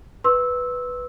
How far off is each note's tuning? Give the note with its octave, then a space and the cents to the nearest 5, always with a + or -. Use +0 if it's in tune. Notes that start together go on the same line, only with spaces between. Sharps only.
B4 +0 C6 +30 E6 -10